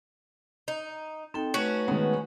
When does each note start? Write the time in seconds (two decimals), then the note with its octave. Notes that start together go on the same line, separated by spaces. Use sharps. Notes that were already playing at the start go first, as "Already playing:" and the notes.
0.68 D#4
1.34 C4 D#4 A4 G5
1.54 A3 C#4 F#4 B4
1.88 D#3 G#3 B3